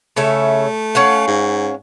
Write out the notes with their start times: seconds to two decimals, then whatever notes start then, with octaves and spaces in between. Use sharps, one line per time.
0.17 C#3 A3 C#5 E5
0.95 C#4 F5 F#5
1.28 G#2